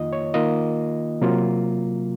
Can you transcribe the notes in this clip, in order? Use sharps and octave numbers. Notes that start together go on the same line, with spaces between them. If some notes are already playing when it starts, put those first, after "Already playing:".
Already playing: F2 D#3 A#3 F4 D#5
C#5
D#3 A#3 F4 D#5
C3 F#3 A#3 F4